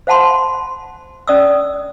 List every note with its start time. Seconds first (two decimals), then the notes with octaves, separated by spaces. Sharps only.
0.07 C5 F5 F#5 A5 B5 C6
1.28 C#4 D5 D#6 E6